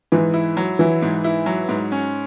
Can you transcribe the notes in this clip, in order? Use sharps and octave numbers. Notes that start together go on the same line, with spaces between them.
G#2 E3
E4
F#3
E3 E4
G#2
E4
F#3
G#2
C#4